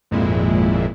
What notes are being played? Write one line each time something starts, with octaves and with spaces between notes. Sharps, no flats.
G#1 F2 A#2 G#3 E4